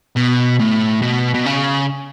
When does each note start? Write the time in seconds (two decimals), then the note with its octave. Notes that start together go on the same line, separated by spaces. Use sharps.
0.16 B2
0.59 A2
1.02 B2
1.35 B2
1.46 C#3